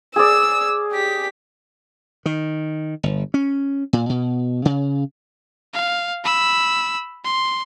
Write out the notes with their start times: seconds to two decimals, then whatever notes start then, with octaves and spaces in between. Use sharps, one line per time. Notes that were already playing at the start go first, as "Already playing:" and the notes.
0.16 G#4 D5 E6
0.92 G4 B6
2.26 D#3
3.03 G1
3.34 C#4
3.93 A#2
4.09 B2
4.65 C#3
5.74 F5
6.24 B5 E6
7.25 C6